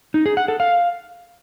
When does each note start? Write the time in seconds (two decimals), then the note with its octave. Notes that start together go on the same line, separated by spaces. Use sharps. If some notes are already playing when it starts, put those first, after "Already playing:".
0.14 D#4
0.26 G#4
0.37 F#5
0.48 A4
0.60 F5